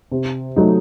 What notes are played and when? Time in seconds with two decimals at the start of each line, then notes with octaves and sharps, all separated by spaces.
0.11 C3
0.56 F#3 A3 D#4